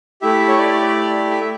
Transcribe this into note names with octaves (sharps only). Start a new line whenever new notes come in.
A3 E4 G4 E5
C#5
D5
E5
E5